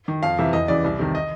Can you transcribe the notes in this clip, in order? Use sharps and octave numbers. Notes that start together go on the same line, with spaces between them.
D#3
F2 F5
C3 E3 E5
E2 D#5
C#3 E3 D5
C2
C3 D#3
D#5